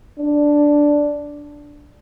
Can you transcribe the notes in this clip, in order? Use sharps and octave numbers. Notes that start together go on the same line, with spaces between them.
D4